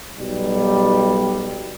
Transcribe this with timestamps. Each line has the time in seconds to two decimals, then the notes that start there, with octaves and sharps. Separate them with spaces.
0.19 B1 G3